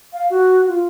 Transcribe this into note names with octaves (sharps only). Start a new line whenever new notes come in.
F5
F#4
F4